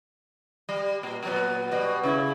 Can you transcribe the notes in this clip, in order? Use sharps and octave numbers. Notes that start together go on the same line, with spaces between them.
G3
A#2
A#2 F#3 B3
B2 G3
C#3 E4